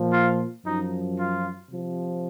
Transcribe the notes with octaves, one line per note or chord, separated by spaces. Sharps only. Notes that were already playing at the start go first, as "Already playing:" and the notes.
Already playing: A#2 F3
F4
F#2 F3 D#4
F4
C3 F3